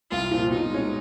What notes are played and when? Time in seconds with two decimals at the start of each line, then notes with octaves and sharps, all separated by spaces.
0.11 C2 F4
0.31 A#2 F3
0.50 B2 D#4
0.70 G#3 C#4